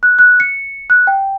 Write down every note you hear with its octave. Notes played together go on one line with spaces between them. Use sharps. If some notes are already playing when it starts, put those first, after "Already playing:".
F#6
F#6
C#7
F#6
G5